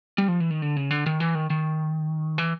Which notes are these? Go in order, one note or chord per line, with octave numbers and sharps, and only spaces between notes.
G3
F3
E3
D#3
D3
C#3
D3
D#3
E3
D#3
D#3
E3